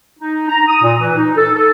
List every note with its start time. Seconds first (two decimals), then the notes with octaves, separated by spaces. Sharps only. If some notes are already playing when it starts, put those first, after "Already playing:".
0.20 D#4
0.49 A#5
0.68 D#6
0.83 A#2
0.99 E3
1.17 D#4
1.36 A4
1.53 A4